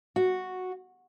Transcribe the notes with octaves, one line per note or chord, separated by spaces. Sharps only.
F#4